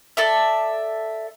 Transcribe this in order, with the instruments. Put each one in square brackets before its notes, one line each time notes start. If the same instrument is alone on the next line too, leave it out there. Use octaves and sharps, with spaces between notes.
[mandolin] A4 D5 E5